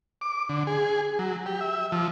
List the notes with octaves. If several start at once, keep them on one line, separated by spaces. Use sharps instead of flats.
D6
D3
G#4
F#3
G4
E5
F3